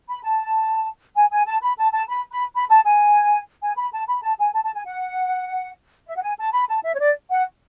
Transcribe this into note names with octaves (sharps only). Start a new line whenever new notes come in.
B5
A5
G#5
G#5
A5
B5
A5
A5
B5
B5
B5
A5
G#5
G#5
B5
A5
B5
A5
G#5
A5
A5
G#5
F#5
E5
F#5
G#5
A5
B5
A5
E5
C#5
D5
F#5